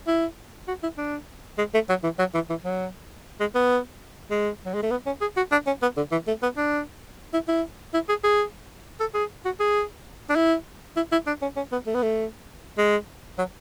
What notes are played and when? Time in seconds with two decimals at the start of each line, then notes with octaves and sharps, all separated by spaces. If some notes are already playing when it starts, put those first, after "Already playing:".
0.07 E4
0.68 F#4
0.83 E4
0.98 D4
1.58 G#3
1.74 A3
1.89 F#3
2.04 E3
2.19 F#3
2.34 E3
2.50 E3
2.64 F#3
3.40 G#3
3.55 B3
4.31 G#3
4.66 F#3
4.74 G#3
4.83 A3
4.91 B3
5.06 C#4
5.21 G#4
5.37 F#4
5.52 D4
5.67 C#4
5.82 B3
5.97 D3
6.12 E3
6.27 A3
6.43 B3
6.57 D4
7.34 E4
7.48 E4
7.94 E4
8.09 G#4
8.24 G#4
9.00 A4
9.15 G#4
9.45 F#4
9.60 G#4
10.30 D4
10.36 E4
10.97 E4
11.12 E4
11.27 D4
11.42 C#4
11.57 C#4
11.72 B3
11.87 A3
11.95 B3
12.03 A3
12.78 G#3
13.38 F#3